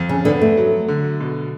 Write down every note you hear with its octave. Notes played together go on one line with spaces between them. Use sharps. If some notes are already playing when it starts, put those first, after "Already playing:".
Already playing: F2
C#3
D3 B3
A3
F#3
D3
B2